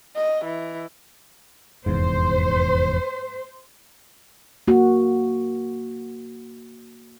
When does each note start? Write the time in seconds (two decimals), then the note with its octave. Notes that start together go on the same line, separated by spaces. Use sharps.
0.16 D#5
0.45 E3
1.86 F1 E2 G#2 C5
4.68 A#3 F#4